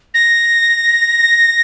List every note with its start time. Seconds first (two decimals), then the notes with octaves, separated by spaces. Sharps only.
0.14 A#6